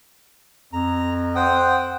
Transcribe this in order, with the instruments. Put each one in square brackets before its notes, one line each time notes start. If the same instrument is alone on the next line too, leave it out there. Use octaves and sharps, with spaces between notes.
[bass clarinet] F2 [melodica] A#5
[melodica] C5 G5 D#6 [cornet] F#5